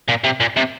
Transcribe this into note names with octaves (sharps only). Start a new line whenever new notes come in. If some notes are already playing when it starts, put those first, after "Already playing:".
A#2
C3
A#2
C3